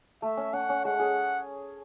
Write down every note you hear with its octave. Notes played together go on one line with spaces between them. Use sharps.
A3 E5
C#4
C#4 F#5
C#4
G#3 F#5
G#4